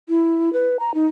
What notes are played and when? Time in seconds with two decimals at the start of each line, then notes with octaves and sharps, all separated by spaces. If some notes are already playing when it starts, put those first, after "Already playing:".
0.09 E4
0.53 B4
0.80 A#5
0.94 D#4